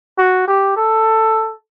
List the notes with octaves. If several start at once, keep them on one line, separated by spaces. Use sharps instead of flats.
F#4
G4
A4